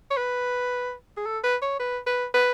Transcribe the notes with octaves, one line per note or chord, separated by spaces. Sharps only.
C#5
B4
G#4
A4
B4
C#5
B4
B4
B4